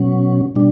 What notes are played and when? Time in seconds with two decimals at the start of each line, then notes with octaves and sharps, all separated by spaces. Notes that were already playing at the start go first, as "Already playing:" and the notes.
Already playing: B2 F#3 C#4
0.56 B2 G3 D4